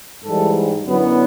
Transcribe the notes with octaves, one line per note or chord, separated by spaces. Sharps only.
G#2 E3 G3 A4
F#2 D3 F#3 B3 E4